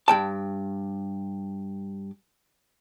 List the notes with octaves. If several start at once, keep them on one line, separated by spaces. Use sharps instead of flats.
G2 G5 A5